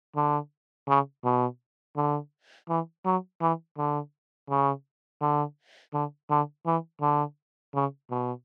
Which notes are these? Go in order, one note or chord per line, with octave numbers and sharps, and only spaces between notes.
D3
C#3
B2
D3
E3
F#3
E3
D3
C#3
D3
D3
D3
E3
D3
C#3
B2